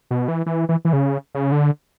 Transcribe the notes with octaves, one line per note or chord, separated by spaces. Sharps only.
B2
E3
E3
E3
E3
C#3
C#3
D3